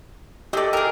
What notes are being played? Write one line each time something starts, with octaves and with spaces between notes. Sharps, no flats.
A3 G4 A4 D5 D#5
G#4 A#4 G5